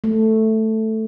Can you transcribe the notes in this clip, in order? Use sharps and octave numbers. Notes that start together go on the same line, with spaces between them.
A3